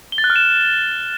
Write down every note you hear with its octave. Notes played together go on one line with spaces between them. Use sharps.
G7
A6
F#6
F6
E7